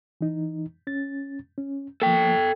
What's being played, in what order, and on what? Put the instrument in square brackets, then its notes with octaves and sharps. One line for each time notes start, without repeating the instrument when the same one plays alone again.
[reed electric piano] E3 D#4
C#4 A6
C#4
[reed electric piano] F3 A#3 [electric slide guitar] A4 G5